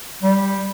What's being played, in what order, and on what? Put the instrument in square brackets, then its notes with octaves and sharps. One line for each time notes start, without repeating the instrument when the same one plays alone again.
[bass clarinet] G3